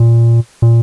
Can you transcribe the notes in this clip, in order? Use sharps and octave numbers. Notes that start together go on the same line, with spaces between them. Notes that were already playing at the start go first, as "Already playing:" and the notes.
Already playing: A#2
A#2